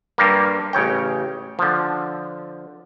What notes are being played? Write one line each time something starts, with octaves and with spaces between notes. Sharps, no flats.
G2 G3 A#3
A1 C#3 C#5 G5
D3 F3